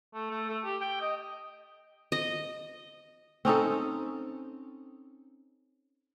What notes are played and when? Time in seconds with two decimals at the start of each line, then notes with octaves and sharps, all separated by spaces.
0.14 A3
0.30 A3
0.49 A3
0.64 G4
0.81 G5
1.01 D#5
2.12 D#5
3.45 C4 C#4 D#4 A4